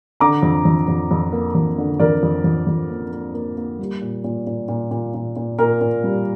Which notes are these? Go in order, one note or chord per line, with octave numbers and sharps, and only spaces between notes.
D3 A#5 D6
F2
F2
F2
F2
A#3
F2
D3
F2 A#4 D5
F2
F2
F2
A#3
A#3
A#3
A#3
G3
A#2
A#2
A#2
A#2
A#2
A#2
A#2
A#2 A#4
A#2
G3